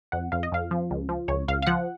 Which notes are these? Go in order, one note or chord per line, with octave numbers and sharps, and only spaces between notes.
F2 F#5
F2 F5
D#5
F2 F5
F3
C#2
F3
C#2 C#5
C#2 F5
F5
F3 F#5